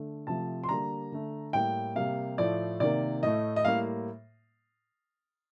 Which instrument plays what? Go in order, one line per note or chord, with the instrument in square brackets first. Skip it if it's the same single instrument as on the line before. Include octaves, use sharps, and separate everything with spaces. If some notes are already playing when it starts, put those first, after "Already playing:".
Already playing: [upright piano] D3 A3
C3 F3 A3 A5
C6
D3 G3 A#3 A#5
D3 A3
A2 G3 A#3 G5
C3 G3 A#3 F5
A2 F3 A3 D5
C3 D#3 A#3 D5
A2 A3 D#5
D#5
A2 G3 A#3 F5